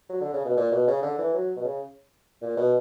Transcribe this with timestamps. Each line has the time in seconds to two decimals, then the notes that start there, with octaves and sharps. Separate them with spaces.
0.09 F#3
0.21 D3
0.33 C#3
0.45 B2
0.57 A#2
0.72 B2
0.87 C#3
1.02 D3
1.18 E3
1.34 F#3
1.56 B2
1.64 C#3
2.42 A#2
2.57 B2